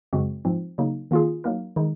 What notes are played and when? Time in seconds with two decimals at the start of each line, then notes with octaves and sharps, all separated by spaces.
0.13 F#2 C#3 G#3 C4 F#4
0.45 G#2 F3 C4
0.78 C#3 F#3 A#3 D#4
1.11 D#3 A#3 F4 G#4
1.44 F#3 A#3 D#4 A#4
1.76 D#3 G#3 D#4